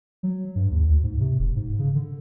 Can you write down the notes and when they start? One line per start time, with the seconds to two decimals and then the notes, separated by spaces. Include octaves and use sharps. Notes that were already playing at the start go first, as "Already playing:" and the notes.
0.23 F#3
0.55 G2
0.71 D#2
0.89 D2
1.03 G#2
1.20 C3
1.39 E1
1.56 G#2
1.79 C#3
1.95 D3